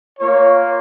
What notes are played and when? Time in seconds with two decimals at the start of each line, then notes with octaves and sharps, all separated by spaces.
0.18 A#3 F4 C#5